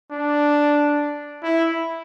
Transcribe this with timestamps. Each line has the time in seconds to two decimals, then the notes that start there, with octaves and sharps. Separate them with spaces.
0.11 D4
1.43 E4